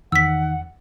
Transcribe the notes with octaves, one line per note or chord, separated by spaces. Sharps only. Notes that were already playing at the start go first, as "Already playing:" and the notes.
E2 D#3 F#5 E6 B6